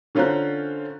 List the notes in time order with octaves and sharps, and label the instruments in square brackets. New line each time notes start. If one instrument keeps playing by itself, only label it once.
[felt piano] D3 C#4 F4 C5 A#5 F#6